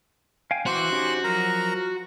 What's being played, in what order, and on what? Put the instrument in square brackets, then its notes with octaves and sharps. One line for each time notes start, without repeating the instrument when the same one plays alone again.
[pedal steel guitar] F5 G5 G#5
[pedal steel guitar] E3 D6 [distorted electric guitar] F#4 [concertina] C5 F#6
[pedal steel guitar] C#4 D#4 G4
[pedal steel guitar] F3 F#3 [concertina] A#4 A#5